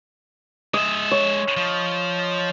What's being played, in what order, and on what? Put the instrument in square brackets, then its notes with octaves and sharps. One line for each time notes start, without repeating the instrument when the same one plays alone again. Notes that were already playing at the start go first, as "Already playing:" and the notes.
[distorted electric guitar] G#3 E5 [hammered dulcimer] D#5
[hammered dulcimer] C#5
[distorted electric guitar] F3